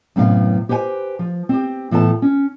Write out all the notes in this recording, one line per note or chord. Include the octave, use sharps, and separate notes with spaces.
F#2 A2 C3 B3 F5
G4 B4 C5 F5 G#5
F3
C4 G4
A2 E3 B3 A4 A5
C#4